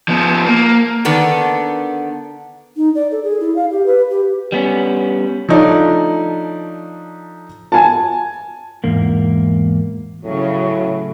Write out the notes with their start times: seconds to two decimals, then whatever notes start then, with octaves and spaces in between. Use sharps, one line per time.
0.08 F3 B3
0.46 A#3
1.05 D3 D#3 B3 D4
2.77 D#4
2.95 D5
3.12 A4
3.23 G#4
3.40 E4
3.56 F5
3.71 G4
3.86 B4
4.10 G4
4.52 G3 B3 C#4
5.49 F3 A3 D4 D#4 C#5 D5
7.72 G#5 A5
8.84 E2 G#2 A#3
10.24 A2 C#3 F#3